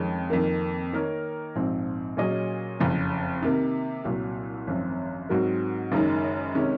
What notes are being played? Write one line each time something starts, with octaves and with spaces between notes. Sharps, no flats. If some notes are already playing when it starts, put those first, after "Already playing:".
Already playing: F2 D#3 G#3 C#4
F2 D#3 A#3
D#3 A#3 D#4 A#4 C#5
A#1 G#2 F3 C4
A#2 F#3 C#4 G#4 D#5
F#1 F2 C#3
C3 D#3 A#3
C2 A#2 F#3
G#1 F#2 F3 C4
G#2 F#3 C4 F#4 A#4
F#1 F#2 D#3 G#3 D#4
C3 D#3 G#3 C#4